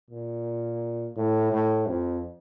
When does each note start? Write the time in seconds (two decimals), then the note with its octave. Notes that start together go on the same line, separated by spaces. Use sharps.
0.10 A#2
1.16 A2
1.52 A2
1.87 F2